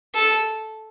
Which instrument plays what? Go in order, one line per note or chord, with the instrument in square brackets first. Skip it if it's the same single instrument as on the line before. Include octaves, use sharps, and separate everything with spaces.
[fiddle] A4